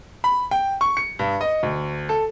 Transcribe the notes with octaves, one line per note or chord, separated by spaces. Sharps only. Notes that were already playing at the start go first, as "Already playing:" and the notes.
B5
G5
C#6
C#7
G2
D#5
D2
A4